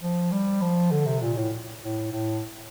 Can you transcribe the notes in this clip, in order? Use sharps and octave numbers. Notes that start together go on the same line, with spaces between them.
F3
G3
F3
D3
C3
A#2
A2
A2
A2